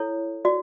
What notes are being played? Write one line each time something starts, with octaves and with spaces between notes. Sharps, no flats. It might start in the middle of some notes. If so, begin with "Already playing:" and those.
Already playing: E4 A4 C#5
F#4 D5